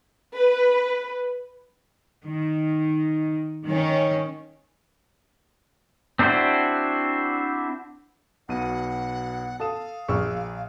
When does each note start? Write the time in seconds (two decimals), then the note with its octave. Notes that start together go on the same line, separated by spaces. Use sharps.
0.36 B4
2.25 D#3
3.66 D#3 C#4
6.19 C4 D4 E4 F#4 C5
8.49 B1 B2 F#5 D#7
9.60 A4 F5 A5 D#6 E7
10.08 A#1 C#6 E6 F6